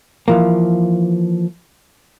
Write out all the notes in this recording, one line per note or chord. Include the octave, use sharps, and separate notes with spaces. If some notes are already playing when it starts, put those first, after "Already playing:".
E3 F3 A#3